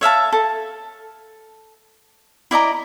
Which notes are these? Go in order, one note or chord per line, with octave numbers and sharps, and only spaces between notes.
C#5 E5 F5 A5
A4
E4 D5 D#5 A#5